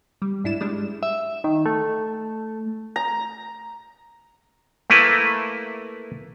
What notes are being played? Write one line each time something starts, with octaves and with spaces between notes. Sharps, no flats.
G3
G#2 D4 E4 E7
G3 G#3 D4
E5
D#3
A3
A#5
A3 A#3 E4 B4